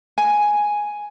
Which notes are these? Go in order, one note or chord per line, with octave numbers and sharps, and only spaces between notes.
G#5